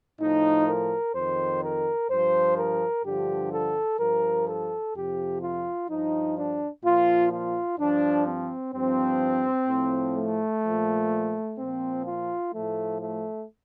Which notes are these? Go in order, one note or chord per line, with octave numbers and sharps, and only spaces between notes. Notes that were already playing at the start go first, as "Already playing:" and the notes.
A2 F3 D#4
A#4
F2 D#3 C5
A#4
G2 F3 C5
A#4
G2 D3 F3 G4
A4
G2 F3 A#4
A4
F2 C3 F3 G4
F4
G2 F3 D#4
D4
A#2 F3 F4
F4
G2 F3 D4
C4
G2 F3 C4
A2 F3
A3
A#2 F3
A#2 F3 C4
F4
A2 F3 A3
A3